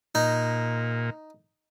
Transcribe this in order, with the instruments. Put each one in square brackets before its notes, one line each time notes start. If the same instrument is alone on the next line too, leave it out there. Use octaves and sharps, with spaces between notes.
[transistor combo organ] A#2 [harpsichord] D#4